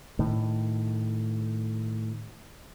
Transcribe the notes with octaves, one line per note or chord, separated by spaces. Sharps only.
A2 D#3